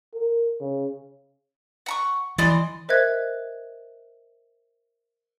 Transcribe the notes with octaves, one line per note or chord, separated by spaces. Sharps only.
A#4
C#3
F#5 A#5 C#6
E3 D5 D#5 C6
A#4 C5 D#5 E5 F#6 G#6